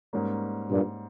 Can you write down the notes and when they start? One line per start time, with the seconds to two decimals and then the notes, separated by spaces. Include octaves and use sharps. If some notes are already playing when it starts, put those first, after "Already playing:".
0.13 G#2 G3 A#3 C#4
0.71 G2 A#2